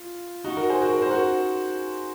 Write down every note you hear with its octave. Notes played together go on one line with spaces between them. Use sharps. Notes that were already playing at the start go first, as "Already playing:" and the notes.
Already playing: F4
D#4 F#4
F#4 A#4
G#4 C5
F#4 A#4
A#4
C5
F#4 A#4